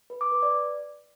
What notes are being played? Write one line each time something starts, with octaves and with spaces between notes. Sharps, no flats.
B4
D6
B4
D5